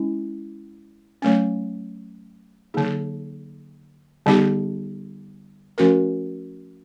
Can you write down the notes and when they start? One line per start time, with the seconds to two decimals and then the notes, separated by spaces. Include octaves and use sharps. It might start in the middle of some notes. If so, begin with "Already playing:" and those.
Already playing: G#3 C#4 E4
1.22 F#3 A3 C#4
2.74 D3 F#3 A#3 D#4 G#4
4.26 D3 G3 B3 D#4 G4
5.78 F3 A3 C#4 F#4 A#4